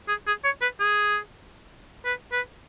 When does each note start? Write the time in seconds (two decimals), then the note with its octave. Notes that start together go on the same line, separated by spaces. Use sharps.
0.08 G#4
0.27 G#4
0.44 C#5
0.62 B4
0.80 G#4
2.05 B4
2.32 B4